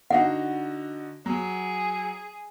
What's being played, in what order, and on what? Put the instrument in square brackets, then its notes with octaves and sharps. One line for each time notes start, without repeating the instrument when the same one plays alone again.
[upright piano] D3 D#4 F#4 [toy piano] F#5
[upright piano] F#3 [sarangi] G#4